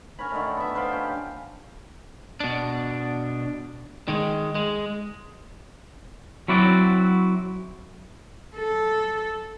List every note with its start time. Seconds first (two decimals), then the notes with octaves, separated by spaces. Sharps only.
0.19 C#4 A#4 C#5 B5
0.32 D3 D#3 A3
0.57 B3 E5
0.75 B4 C5 F5 G5
0.93 C#4 G4
2.40 B2 D4
4.08 D#3 G#3
4.55 G#3
6.48 F#3 C4 E4 F#4 D5
8.56 A4